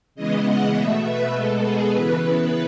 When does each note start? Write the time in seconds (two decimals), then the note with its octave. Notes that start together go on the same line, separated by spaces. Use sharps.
0.15 C#3 E3 G#3 B3 D#5
0.45 F#5
0.74 B2 A3 E5
1.04 B4
1.33 B2 G#3 B3 A4
1.63 G#4
1.92 C#3 E3 B3 B4